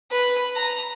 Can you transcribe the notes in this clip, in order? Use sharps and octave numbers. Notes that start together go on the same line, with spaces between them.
B4
A#5